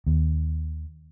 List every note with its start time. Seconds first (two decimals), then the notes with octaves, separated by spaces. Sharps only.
0.06 D#2